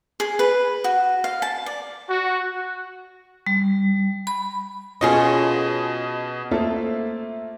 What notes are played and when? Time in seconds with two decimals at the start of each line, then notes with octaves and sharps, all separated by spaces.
0.20 G#4
0.39 B4
0.84 F#4
1.24 F5
1.42 A5
1.66 D5
2.08 F#4
3.47 G3
4.27 B5
5.01 B2 C#4 F4 G#4 D#5
6.51 A3 A#3 C4 F4 A4 E5